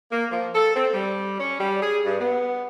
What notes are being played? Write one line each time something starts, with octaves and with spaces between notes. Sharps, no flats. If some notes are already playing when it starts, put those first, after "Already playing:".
A#3
F3
A4
C4
G3
C#4
G3
G#4
G2
B3